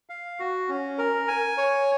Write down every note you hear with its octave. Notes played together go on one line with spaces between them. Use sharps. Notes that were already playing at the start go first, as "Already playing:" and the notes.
F5
F#4
C#4
A#4
G#5
C#5